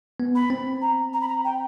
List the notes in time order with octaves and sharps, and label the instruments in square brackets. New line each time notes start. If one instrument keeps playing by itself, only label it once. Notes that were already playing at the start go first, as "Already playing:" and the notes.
[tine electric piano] B3
[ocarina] B5
[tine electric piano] C4
[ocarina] A#5
A#5
B5
A#5
G5